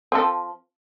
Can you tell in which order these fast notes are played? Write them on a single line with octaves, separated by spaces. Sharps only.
C4 A4 F3